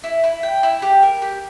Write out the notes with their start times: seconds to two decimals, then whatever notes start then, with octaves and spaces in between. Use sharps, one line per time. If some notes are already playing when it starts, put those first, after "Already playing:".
0.04 E4
0.24 E4
0.43 G5
0.63 E4
0.82 G4
1.03 A#4
1.22 G4